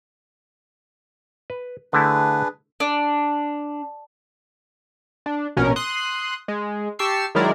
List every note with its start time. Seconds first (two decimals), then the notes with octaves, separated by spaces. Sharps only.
1.50 B4
1.93 D3 A3 D4 E4 G#4 B4
2.80 D4
5.26 D4
5.56 A#1 B2 C#4 A#4
5.76 C6 D#6 F#6
6.48 G#3
6.99 G4 A5 C#6 E6 C7
7.35 D#3 F#3 G#3 E4 A#4 D5